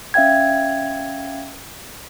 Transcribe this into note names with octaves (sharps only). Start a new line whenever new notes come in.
C#4 E5 F5 G5 G#6